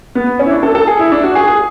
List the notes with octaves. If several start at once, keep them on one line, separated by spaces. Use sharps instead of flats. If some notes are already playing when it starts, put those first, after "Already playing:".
B3
C#4
E4
D4
A4
A4
G#4
E4
D4
F#4
G#4
G#4